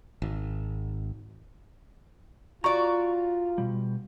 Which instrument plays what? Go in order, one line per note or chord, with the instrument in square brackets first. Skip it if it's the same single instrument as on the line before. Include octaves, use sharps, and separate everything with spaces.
[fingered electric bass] G#1
[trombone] F4 [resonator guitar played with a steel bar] F#4 D5 [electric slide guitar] A#5 [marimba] C#6
[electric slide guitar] B2 G3